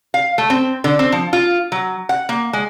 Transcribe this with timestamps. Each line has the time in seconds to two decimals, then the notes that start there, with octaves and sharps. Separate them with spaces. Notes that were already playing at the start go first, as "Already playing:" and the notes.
0.14 F5
0.38 A3
0.50 C4
0.84 D3
0.99 C4
1.12 F3
1.33 F4
1.72 F#3
2.09 F#5
2.29 A#3
2.53 G#3